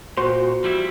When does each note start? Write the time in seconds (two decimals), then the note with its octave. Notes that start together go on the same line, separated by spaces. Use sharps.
0.17 A#2 F#4 C5
0.64 F3 G3 E4